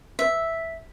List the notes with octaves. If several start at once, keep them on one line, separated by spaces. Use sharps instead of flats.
E5